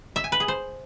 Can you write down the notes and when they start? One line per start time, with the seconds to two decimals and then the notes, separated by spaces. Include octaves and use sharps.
0.16 E5
0.24 G#5
0.32 B4
0.40 G#4
0.48 C5